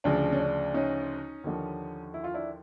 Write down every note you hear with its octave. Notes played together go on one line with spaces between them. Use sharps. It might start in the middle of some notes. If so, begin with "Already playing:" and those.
D2 C#3 F3 D4
C#4
D4
C#4 D#4
D#2 D3 F3
E4
F4
D4 E4